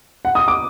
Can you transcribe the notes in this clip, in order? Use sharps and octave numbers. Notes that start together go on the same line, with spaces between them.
F#5
D#6
D6